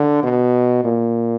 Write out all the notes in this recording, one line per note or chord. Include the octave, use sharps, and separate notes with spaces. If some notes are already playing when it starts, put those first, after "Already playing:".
Already playing: D3
B2
A#2